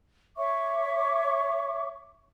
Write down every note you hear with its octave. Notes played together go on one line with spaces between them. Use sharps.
C#5 E5 C#6 D6